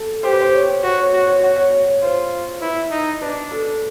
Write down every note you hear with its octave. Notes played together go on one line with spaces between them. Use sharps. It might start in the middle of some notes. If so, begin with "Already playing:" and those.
Already playing: A4
G4 C5
B4
C5
C#5
F#4 C#5
C#5
F#4 C#5
C#5
F#4 C#5
C#5
C#5
C#5
F4 C5
E4 B4
D#4
D4 B4
A4